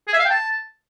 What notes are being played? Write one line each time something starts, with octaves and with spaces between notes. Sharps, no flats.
G#4
E5
F5
G5
A5